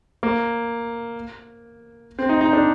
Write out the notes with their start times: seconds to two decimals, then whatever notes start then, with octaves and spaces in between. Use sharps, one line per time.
0.23 A#3
2.19 C4
2.29 D#4
2.41 D#4
2.53 D4